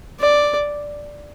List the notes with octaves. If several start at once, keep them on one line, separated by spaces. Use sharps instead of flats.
D5